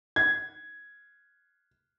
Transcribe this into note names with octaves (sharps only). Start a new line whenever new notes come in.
G#6